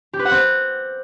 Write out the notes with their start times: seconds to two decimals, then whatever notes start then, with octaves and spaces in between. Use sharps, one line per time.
0.13 G4
0.19 B4
0.25 F#5
0.31 C4